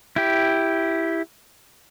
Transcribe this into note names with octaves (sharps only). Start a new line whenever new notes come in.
E4 G4